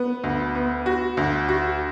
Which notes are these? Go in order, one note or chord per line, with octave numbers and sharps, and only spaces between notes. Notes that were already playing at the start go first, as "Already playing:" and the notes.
Already playing: B3
D2
B3
F#4
D2
F#4